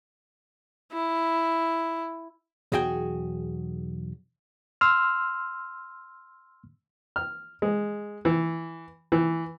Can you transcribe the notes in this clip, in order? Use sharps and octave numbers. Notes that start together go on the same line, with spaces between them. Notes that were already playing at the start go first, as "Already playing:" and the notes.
E4
B1 E2 F#4 G#4 G5
C6 E6 F6
F6
G#3
E3
E3